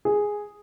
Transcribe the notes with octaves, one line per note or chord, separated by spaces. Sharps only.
G#4